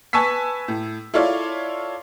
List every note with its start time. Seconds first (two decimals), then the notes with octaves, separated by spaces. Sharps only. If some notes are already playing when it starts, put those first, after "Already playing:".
0.13 B4 G#5 A5 C#6 E6 B6
0.68 A2
1.14 E4 F4 A4 C#5 D5 F5